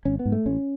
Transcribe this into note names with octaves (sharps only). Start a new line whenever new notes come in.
G#1 C#4
B3
G#2
A3
A1 C#4